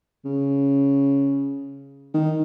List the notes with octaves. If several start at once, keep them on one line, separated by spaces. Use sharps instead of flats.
C#3
D#3